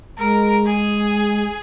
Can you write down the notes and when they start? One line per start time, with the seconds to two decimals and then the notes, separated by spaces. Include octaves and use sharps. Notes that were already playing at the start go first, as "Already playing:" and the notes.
0.18 G#3 A#4
0.66 G#4